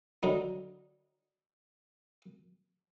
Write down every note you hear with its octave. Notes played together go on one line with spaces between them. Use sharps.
D3 F#3 D#4